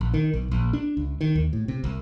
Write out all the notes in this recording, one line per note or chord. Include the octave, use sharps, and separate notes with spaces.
A#1
D#3
B1
A#1
D4
C#2
D#3
D#2
A2
C3
C2